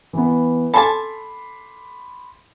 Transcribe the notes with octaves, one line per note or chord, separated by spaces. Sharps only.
E3 B3
A4 G#5 A5 B5 C6 D6